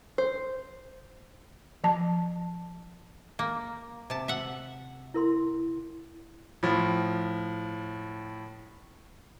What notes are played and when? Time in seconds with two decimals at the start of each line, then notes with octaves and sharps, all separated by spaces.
0.18 C5
1.84 F3 A5
3.39 A#3
4.10 C3 A5
4.28 E5 F#5
5.14 E4 A#4 C6
6.63 A2 F3